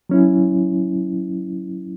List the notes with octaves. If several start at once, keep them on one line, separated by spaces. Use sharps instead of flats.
F#3 C#4 E4